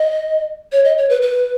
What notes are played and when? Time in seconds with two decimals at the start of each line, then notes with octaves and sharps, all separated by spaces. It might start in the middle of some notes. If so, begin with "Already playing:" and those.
Already playing: D#5
0.72 C#5
0.85 D#5
0.98 C#5
1.10 B4
1.22 B4